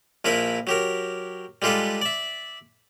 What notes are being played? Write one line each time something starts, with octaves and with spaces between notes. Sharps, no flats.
A#1 F3 E4 A#4 B4 E5
F#3 G4 A#4
G3 G#3 F4 G4 A4 B4
D5 E5